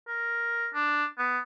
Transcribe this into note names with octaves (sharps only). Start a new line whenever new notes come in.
A#4
D4
B3